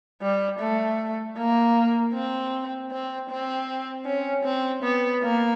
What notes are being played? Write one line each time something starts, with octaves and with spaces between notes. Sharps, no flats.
G3
A3
A#3
C4
C4
C4
C#4
C4
B3
A#3